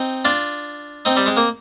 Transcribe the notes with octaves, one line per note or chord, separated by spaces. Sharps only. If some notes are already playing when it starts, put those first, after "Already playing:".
Already playing: C4 D#4
D4 F4
C4 D#4
G3
G#3
A#3